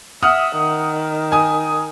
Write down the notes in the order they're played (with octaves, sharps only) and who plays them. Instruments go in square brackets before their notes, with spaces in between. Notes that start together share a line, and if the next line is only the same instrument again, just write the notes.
[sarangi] E5 [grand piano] F#5 D#6 F6
[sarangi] D#3
[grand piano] G#5 D#6